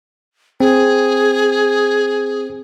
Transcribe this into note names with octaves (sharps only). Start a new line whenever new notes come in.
C4 G#4